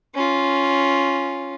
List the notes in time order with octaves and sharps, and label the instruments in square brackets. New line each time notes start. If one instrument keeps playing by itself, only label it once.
[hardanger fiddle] C#4 F4